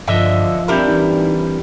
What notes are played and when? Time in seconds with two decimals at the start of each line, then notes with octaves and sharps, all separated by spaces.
0.08 G2 D3 F3 D#5 E5
0.68 G3 C4 D4 E4 A#4 E5
0.88 E3 D#4